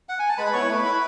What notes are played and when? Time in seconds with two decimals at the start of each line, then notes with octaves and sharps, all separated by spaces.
0.09 F#5
0.19 G#5
0.29 A5
0.38 G#3 B4 B5
0.53 B3 E4 C#5 C#6
0.69 A3 B4 B5
0.85 E4